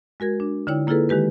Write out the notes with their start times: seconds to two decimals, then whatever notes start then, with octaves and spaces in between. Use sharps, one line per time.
0.20 G#3 F#4 A#4 G#6
0.40 D4
0.67 D3 D#4 E4 C#5 G5
0.87 A#3 E4 F4 G#4 A4 B4
1.09 D#3 G#3 G4 B4